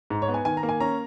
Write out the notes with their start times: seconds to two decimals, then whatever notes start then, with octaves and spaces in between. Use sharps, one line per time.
0.10 G#2
0.22 C#5
0.28 B3
0.34 G#5
0.45 D#3 G#5
0.57 A#5
0.63 A#3
0.69 G#5
0.80 C#4 A#5